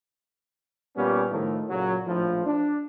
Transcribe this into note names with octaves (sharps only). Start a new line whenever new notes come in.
A#2 G3 B3 C#4 G4
A2 D#3 F3 A3
A#2 C#3 F#3
A#1 A2 F3
D4